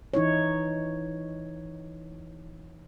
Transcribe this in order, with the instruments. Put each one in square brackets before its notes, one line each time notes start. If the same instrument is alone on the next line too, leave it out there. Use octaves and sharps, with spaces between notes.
[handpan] E3 D#4 E4 C#5